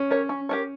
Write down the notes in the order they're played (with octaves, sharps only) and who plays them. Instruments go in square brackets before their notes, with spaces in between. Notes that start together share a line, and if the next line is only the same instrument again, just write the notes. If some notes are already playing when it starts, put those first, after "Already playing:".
Already playing: [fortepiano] C#4
[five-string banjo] G4 A#4 C#5
C#4
G4 A#4 C#5